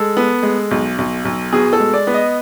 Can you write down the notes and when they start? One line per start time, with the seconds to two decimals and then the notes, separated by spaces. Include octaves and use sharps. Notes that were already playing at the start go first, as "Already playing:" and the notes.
Already playing: G#3 A4
0.17 B3
0.43 G#3
0.71 B1
0.98 B1
1.25 B1
1.53 B2 G#4
1.73 A4
1.80 G#3
1.94 D5
2.07 B3
2.14 D#5